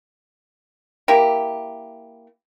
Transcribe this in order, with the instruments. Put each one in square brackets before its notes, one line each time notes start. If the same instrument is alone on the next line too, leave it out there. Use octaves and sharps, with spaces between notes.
[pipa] A#3 E4 G4